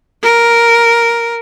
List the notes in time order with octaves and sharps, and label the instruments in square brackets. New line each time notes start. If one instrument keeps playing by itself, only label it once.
[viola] A#4